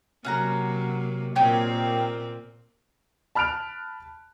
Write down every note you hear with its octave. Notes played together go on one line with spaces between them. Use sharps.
C3 F#3 A#3 C#4 F#5 A#5
A#2 A#3 C4 D#4 G4 C#5
A5 B5 F6 F#6 D7 F7